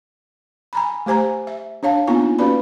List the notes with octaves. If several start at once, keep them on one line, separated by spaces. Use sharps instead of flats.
G#5 A#5 B5
A3 G4 C5 G#5 A#5
E5
D4 C#5 F5 A5
A#3 B3 D4 D#4 F4 G#5
A#3 C#4 F#4 B4 D5 B5